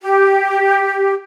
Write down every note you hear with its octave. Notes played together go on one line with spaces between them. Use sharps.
G4